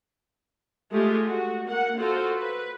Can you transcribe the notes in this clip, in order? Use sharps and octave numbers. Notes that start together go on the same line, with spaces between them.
G#3 A3 F4 G4 G#4
F#4
A#3 F#5
F4 F#4 A4 C5
B4